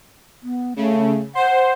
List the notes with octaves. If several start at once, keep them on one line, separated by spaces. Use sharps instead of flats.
B3
C#3 A3
C5 F#5